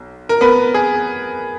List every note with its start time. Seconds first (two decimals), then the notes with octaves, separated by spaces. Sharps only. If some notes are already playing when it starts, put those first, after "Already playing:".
Already playing: B1
0.29 A#4
0.41 B3 B4
0.74 G#4